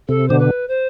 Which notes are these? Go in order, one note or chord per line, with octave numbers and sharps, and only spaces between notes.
C3 A4
B2 D3 C5
B4
C5